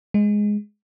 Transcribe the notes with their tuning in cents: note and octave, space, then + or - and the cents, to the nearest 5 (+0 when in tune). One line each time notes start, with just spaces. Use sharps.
G#3 +0